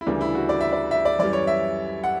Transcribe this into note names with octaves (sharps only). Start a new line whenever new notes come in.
E4
D2 C#3 E3 G3 D4
E4
F#4
D5
E5
D5
E5
D5
F#2 E3 G3 D5
C#5
E5
F#5